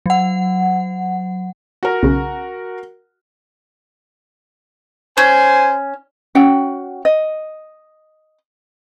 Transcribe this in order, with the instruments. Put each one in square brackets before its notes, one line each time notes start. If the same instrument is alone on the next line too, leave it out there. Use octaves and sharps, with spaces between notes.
[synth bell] F#3 F#5
[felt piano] F#4 A#4
[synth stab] B1 C#3
[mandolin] C#4 [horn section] C5 G#5
[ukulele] C#4 F#4 F#5 G5
D#5